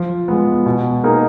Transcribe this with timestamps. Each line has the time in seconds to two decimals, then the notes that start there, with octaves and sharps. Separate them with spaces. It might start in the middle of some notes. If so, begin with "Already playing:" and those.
Already playing: F3
0.28 G#3 B3
0.66 B2
1.04 A#3 D#4 G#4